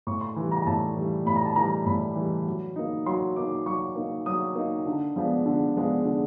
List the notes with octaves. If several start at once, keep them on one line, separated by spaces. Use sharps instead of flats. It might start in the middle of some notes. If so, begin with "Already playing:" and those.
A2 C#6
C6
E3 G3
A#5
A#5
A2 A5
E3 G3
A2 B5
A#5
A5
E3 G3 A#5
A2 B5
E3 G3
F#3
A#3 D#4
F#3 C6
A#3 D#4 D6
F#3 C#6
A#3 D#4
F#3 D#6
A#3 D#4
D3
F3 G#3 B3 D4
D3
F3 G#3 B3 D4
D3